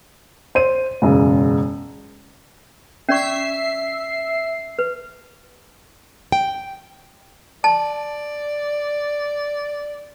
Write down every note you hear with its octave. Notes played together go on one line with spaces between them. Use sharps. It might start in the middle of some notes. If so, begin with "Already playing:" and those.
C5 D#7
E1 F#2 C#3
C#4 D5 E5 C#6 C7
B4
G5
D5 A5